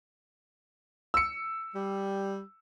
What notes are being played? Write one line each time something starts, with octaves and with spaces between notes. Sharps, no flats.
E6 C#7
G3